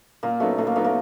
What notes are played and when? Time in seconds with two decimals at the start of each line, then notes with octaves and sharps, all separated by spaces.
0.23 A#2 A#3
0.40 F#3 A3 B3 D#4
0.58 A#2 A3
0.67 A#3
0.76 F#3 A3 B3 D#4
0.84 A#3